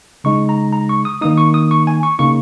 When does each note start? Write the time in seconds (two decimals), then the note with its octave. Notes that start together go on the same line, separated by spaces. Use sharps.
0.24 C#3 G#3 D#4 C#6
0.49 A#5
0.73 A#5
0.89 C#6
1.05 D#6
1.21 D#3 A#3 D#4 D#6
1.38 C#6
1.54 D#6
1.71 C#6
1.87 G#5
2.03 C#6
2.19 C#3 A#3 D#4 C#6